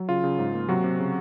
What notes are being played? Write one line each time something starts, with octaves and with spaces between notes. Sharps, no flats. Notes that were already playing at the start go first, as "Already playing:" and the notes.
Already playing: F#3
C#3 F4
C#3
G#2
A#3
C3 F#3 F#4
C3
C#3